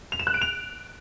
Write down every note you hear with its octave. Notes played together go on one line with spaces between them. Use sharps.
F7
E7
F#6
D7
F7